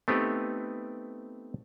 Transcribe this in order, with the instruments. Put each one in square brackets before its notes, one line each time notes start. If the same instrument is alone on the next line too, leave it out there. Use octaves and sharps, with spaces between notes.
[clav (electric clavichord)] A3 B3 C4 D#4 G4 B4